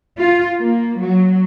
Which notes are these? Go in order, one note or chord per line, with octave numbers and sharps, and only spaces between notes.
F4
A#3
F#3